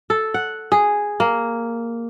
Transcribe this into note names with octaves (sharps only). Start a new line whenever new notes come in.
A4
F#5
G#4
A#3